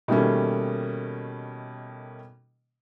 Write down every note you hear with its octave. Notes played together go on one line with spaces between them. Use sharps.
B2 D#3 G3 A3 A#3 C#4